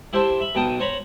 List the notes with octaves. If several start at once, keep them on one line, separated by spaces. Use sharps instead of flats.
E4 G4 C5 E5 A5 C6
E5 B5
B1 B2 G5 A5 D#6
C5 C#5 A#5 B5